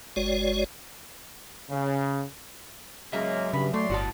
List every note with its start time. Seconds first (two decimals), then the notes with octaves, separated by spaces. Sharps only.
0.16 G1 G#3 F#4 C#5 D5
1.71 C#3
3.13 C#3 F#3 G#3 A#3 E5
3.53 G2 C#3 B5
3.74 A3 C#5 D5 C6
3.90 G1 A2 F#4 A5